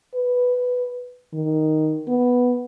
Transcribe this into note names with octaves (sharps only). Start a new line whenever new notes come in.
B4
D#3
B3